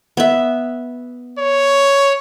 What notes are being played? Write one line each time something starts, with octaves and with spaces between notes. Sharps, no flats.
B3 E5
C#5